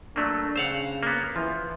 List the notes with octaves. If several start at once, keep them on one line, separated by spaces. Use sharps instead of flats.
F#3 A3 A#3 D4
C#3 C5 F5 F#5
A#3 B3
E3 F3